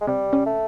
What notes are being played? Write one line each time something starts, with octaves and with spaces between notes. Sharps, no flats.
G#3
C3 G3
C#4
A3